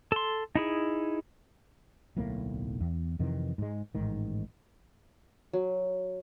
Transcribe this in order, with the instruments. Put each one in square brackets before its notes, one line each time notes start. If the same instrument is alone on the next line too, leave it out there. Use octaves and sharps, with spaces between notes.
[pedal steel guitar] A4 C6
D#4 E4 G#4
[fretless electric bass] D1 B1 A2 A#3
E2
F2 C3 D#3 E3
G#2 G#3
A1 G#2 D#3
[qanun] F#3